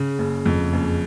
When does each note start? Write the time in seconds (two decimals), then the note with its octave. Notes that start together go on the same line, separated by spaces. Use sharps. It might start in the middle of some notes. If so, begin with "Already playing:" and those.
Already playing: C#3
0.18 F#1
0.46 F2
0.73 F#1